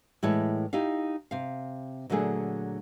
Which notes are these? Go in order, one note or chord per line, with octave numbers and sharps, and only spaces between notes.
A2 E3 G#3 E4 C#5 A5
D#4 E4 G4 F5
C3 F5
A#2 D3 F#3 A3 G#4